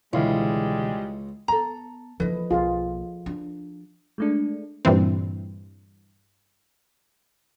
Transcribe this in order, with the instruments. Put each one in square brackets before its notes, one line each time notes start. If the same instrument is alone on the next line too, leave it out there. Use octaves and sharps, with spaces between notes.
[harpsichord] C#2 [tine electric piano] B2 D3 E3 [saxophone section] G3 G#3 [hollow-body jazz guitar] E4 F5
[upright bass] B3 [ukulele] A4 A#5
[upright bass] E3 A#3 [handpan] F3 A4 [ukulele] B4 D#5
[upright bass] B1 A#3 [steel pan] F4 G#4
[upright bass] D4
[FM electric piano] G#3 A3 D4
[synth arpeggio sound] G2 A#2 E3 C4